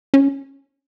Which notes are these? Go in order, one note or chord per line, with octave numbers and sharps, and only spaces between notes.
C#4